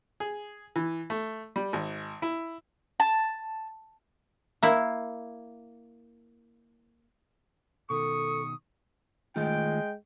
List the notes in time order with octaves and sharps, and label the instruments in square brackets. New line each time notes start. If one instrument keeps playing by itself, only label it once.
[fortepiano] G#4
E3
A3
G3
G#1
E4
[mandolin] A5
[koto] A#3 E4
[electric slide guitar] B2 D#3 [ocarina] A4 [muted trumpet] C#6 [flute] D#6
[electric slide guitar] D#3 A3 F4 [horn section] G#3 G5